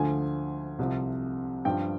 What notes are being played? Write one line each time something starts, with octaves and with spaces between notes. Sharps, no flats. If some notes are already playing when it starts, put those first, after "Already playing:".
Already playing: D2 D3 F3 G#5
C2 C3 F3
G2 F3 G5